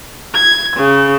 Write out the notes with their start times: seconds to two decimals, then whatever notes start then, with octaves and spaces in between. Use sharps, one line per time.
0.34 G#6
0.75 C#3